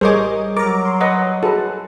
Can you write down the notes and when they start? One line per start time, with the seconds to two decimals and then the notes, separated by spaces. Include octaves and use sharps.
0.01 A1 G3 G#4 A#4 C5 C#5 D#5 D6
0.57 F#3 A#4 A#5 D6
0.85 C6
1.01 B4 D#5 F#5
1.43 F#4 G#4 A4 B4